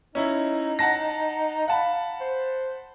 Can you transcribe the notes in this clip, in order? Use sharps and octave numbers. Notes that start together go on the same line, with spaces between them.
C#4 D#4 E4
F#5 A5 A#6
F5 F#5 A5 B5
C5